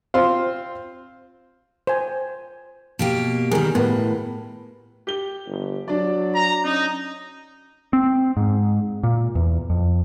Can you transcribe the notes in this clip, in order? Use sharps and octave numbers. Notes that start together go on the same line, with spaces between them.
C4 F4 C5
C5 G#5
B2 A#3 G4
D#3 G3 G#4 A#4
A2 B3 A#4 B4
G4 G7
G1
F#3 D4 D5
A#5
C#4 D#4
C4
G#2
A#2
E2
F2